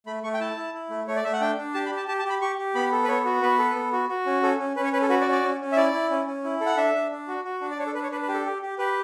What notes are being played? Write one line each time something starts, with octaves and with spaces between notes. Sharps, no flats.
A3 B5
A3 C#6
G5
E4 A5
E4
E4
A3
A3 C#5
D5
A3 E5
F#5
D4 G5
D4
G4 A5
B5
G4
A5
G4 A5
A5
G4 B5
G4 C#6
G4
B3 B5
A4
B4
B3 C#5
F#4
B3 B4
A4
B3
F#4
F#4
C#4
C#4 A4
C#4
C#4 B4
C#5
C#4 B4
A4
F#4 B4
D5
C#4
D5
C#4
C#4
E5
E4 D5
E4
C#4
C#4
E4
A4
F#5
D4 E5
D4
D4
F#4
F#4
D4
D5
D4 C#5
A4
D4 B4
C#5
D4 B4
B4
G4
A4
G4
G4
G4 B4